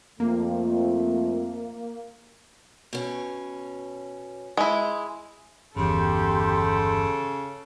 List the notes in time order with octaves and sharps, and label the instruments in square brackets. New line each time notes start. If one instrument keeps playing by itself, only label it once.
[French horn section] F2 A3 [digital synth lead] A#3
[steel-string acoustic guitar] B2 C#4
[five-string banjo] G#3 E4
[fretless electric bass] G1 E2 [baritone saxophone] C#3 [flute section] G4 C6 [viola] A4